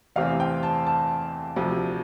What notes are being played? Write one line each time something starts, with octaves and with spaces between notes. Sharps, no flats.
E2 C3 E3 A3 C4 F5
G5
A5
A5
D2 C3 F3